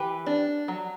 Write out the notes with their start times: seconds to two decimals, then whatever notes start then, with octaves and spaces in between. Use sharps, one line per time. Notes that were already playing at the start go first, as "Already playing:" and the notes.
Already playing: E3 G4 B4
0.26 D4
0.68 F#3